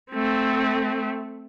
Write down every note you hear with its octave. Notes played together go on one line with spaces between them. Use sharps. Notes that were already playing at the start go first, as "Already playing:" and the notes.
A3 C4